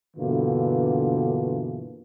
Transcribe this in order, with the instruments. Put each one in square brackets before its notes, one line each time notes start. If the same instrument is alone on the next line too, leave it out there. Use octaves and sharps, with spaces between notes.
[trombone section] G2 B2 D3 E3 A#3 F4